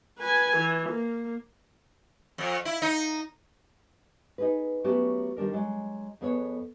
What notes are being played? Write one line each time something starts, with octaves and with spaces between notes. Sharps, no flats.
B4 G#5
E3
A#3
F2
E4
D#4
D#4 G#4 B4
F#3 A3 B3 C#4 F#4 G4
D#3 G3 D4 A#4
F#3 G#3
F2 B3 G#4 A4 C#5